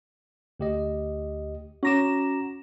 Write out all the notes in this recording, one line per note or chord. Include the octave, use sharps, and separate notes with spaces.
D2 G4 D#5
C#4 F#4 A#5 D6 A#6 E7